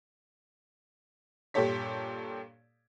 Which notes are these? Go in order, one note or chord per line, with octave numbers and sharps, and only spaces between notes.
G2 A#2 G4 A4 C#5 B6